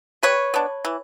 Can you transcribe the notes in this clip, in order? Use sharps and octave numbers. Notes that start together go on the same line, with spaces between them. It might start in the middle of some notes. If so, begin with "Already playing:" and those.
G3 B4 C#5
B3 D4
E3